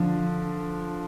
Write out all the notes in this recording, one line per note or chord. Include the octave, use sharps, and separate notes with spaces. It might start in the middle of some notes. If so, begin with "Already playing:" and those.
Already playing: D3 F3